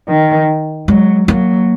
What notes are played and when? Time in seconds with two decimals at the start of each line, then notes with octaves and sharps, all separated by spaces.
0.08 D#3
0.88 F#3 G#3
1.28 F#3 A#3